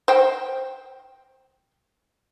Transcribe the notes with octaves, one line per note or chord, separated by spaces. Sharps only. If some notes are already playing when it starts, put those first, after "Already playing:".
C5 G5